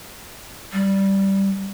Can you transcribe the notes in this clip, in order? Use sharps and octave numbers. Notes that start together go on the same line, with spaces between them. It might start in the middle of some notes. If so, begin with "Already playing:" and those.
G3